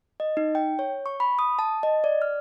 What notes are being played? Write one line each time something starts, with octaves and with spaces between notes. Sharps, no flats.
D#5
D#4
G5
C#5
C#6
B5
D#6
A5
D#5
D5
F6